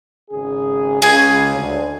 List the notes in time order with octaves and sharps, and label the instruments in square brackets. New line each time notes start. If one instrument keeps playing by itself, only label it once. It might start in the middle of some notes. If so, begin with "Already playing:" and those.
[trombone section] G#1 C#3 G#4
[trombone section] C#2 C#3 [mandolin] G#4 G#5
[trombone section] D2